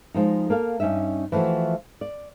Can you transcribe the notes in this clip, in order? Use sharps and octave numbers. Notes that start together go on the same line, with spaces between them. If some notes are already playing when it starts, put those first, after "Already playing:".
F3 G#3 D#4
A#3 A4 F5
G2 C#4 D#4 D#5 E5
E3 F3 A3 F4 F#4
D5